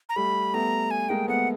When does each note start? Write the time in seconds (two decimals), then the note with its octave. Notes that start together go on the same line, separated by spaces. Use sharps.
0.09 A#5
0.16 G3 A3 B5
0.53 A3 B3 A#5
0.91 G#5
1.09 G#3 A#3 G5
1.28 A3 B3 F#5